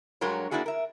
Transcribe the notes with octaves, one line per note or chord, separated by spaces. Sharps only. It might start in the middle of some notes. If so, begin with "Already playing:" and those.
G2 F#3 G#3 A#4 C#5
A#3 D4 E4 F#4 G#4
A#4 E5